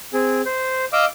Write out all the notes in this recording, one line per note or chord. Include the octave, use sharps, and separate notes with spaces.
C4 G#4
C5
D#5 F5 D6 E6